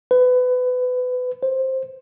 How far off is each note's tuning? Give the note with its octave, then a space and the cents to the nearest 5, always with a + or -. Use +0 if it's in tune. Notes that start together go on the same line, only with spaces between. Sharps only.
B4 +25
C5 +10